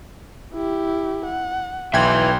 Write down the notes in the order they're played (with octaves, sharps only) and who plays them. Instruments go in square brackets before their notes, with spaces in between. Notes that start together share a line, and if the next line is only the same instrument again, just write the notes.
[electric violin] E4 G4
F#5
[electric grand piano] B1 G5 G#6 [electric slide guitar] B4 E5 [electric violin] C6